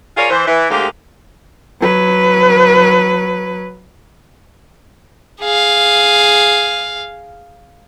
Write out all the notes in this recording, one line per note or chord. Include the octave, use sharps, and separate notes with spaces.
F4 G#4 A#4 C#5 D5 F5
E3 C5
E3
D2 G#3 A#3 G4
F#3 B4
G#4 F5